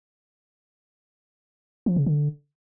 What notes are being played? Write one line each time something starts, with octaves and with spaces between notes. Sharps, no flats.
F3
C#3
D3